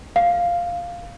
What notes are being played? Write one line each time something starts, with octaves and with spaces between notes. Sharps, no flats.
F5